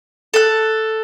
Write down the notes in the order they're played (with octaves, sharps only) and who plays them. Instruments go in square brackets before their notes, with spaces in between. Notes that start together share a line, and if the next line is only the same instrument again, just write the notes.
[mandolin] A4 F#6